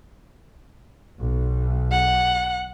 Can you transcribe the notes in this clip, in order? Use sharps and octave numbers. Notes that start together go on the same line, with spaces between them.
B1
F#5